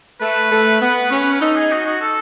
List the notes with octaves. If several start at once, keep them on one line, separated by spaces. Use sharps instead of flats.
A3 B4
A3
B3
C#4
B4
D#4 A4
G#4
F#4
F#4
A4